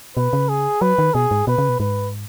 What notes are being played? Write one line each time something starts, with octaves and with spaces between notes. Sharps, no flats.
B2 B4
C#3
G#4
F#3 B4
D#3
B2 G#4
G#2
B2 B4
C#3
B2
G#2 B4